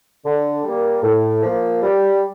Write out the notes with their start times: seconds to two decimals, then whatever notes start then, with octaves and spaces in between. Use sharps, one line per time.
0.24 D3
0.63 G3 A#3
1.03 A2
1.42 F3 A#3
1.82 G3